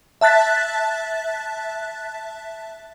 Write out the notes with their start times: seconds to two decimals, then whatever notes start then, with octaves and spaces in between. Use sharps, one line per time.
0.21 E5 A5 F#6 A6 B6